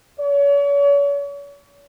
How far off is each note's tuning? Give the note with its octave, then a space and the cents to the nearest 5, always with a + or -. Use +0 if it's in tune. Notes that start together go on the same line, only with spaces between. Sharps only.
C#5 +40